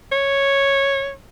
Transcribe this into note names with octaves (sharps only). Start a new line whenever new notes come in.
C#5